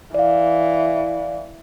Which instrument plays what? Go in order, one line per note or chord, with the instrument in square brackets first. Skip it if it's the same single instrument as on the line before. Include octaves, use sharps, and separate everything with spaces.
[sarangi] E3 [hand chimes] D5 F5